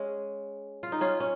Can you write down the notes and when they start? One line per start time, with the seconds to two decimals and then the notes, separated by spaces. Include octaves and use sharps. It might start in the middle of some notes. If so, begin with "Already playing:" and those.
Already playing: G#3 C#4
0.83 F4
0.92 D#4
1.01 C#4 F4
1.20 C#4